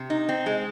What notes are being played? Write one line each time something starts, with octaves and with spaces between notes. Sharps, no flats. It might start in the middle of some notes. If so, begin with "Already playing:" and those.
Already playing: C3
D#4
C4
G#3